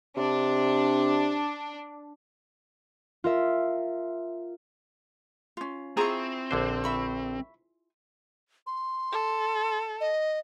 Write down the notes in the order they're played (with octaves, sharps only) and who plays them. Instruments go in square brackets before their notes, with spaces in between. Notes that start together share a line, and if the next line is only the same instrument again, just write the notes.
[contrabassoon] C3 [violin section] D4
[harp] F4 A#4 E5
[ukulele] C#4 F4
[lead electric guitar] C4 [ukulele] E4 F4 G#4 [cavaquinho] A#5 C#6
[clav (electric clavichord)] A#1 D3 C5
[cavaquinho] E5 B5 C#6
[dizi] C6
[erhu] A4
[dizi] D#5